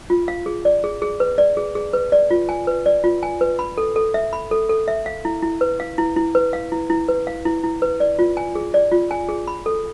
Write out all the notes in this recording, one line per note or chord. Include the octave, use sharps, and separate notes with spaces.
F4
F5
G#4
D5
G#4
G#4
B4
D5
G#4
G#4
B4
D5
F4
G#5
B4
D5
F4
G#5
B4
B5
A4
A4
E5
B5
A4
A4
E5
F5
E4
E4
B4
F5
E4
E4
B4
F5
E4
E4
B4
F5
E4
E4
B4
D5
F4
G#5
G#4
D5
F4
G#5
G#4
B5
A4